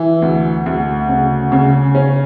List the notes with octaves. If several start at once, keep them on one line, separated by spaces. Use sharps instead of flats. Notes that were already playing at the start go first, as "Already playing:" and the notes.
Already playing: E3
D2
D2
C#3
C#3
C#4